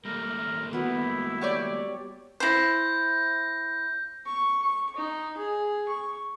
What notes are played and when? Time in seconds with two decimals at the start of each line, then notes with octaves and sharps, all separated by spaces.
0.05 G3 A3 A#3 A#4
0.73 B3 E4 F#4
1.41 G4 C#5 D5
2.40 E4 C5 G6 A#6
4.26 C#6
4.62 C#6
4.96 D#4
5.37 G#4
5.88 C#6